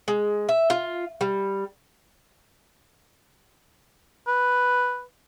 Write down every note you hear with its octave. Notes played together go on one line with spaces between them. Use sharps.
G#3
E5
F4
G3
B4